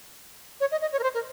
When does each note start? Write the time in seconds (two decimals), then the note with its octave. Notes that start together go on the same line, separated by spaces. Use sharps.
0.60 C#5
0.71 D#5
0.81 D#5
0.93 C#5
0.99 A#4
1.03 C5
1.14 A#4